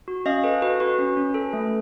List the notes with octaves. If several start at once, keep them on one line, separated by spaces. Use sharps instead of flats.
F#4
C#4 D#5 F5
A4 B4
F#4 B4
F#4 B4
C#4
C#4
A4
A3